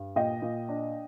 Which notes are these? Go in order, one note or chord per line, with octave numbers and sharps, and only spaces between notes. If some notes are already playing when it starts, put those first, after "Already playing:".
Already playing: G2
A#2 D#5 G5
A#2
D4